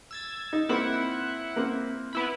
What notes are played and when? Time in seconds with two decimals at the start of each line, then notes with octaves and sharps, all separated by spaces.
0.11 E6 G#6 A6
0.53 D#4
0.69 A#3 C4 E4 F#5
1.56 A#3 C4
2.13 B3 E4 B5